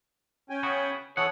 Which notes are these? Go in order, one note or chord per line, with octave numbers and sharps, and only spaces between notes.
C#4 G5 G#5
C#3 B3 F#4
E3 A4 C#5 F#5 D#6